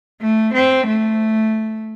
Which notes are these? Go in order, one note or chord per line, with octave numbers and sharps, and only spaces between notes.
A3
C4
A3